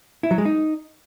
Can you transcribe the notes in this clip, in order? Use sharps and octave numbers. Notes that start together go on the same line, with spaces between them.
E4
F#3
G#3
D#4